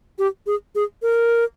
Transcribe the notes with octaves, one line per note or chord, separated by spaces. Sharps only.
G4
G#4
G#4
A#4